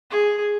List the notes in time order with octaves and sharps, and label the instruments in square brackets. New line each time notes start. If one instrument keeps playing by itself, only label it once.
[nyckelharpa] G#4